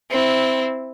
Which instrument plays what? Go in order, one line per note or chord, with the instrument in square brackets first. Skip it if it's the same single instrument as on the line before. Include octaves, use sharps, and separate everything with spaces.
[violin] C4 E4